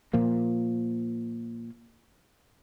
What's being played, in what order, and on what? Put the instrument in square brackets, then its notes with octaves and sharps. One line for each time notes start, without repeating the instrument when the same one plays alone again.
[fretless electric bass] A#2 F3 A#3